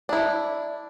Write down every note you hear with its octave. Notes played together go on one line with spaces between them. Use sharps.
D4 E4